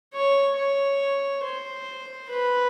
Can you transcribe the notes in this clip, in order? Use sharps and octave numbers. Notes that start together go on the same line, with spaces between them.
C#5
C#5
C5
B4